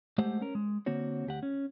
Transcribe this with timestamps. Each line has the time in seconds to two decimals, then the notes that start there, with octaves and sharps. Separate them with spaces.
0.18 G#3 A3 G4 C5 F#5
0.41 C#4 A#4
0.55 G#3
0.86 D3 A#3 C4 F#4 C#5
1.27 D2 G4 F#5
1.43 C#4